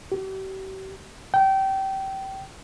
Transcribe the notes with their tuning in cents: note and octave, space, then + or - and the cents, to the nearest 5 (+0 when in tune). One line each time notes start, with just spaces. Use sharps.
G4 -40
G5 -25